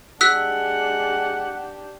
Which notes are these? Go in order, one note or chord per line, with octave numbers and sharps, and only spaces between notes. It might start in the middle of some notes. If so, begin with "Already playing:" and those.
G#3 D4 G4 F#5 E6 F#6 B6